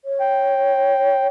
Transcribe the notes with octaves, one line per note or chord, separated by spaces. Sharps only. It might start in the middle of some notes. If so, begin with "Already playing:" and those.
C#5
G5